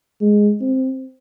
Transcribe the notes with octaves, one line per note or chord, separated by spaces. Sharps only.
G#3
C4